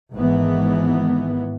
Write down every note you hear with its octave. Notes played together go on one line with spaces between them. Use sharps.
G#1 G#2 E3 B3